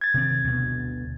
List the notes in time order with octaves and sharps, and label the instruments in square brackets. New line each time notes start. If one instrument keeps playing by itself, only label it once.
[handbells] G#6 A6
[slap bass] C3 D#3 C4
D2 B2